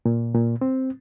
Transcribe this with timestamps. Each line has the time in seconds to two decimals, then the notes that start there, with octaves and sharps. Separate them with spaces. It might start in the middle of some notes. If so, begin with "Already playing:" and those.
0.05 A#2
0.34 A#2
0.61 C4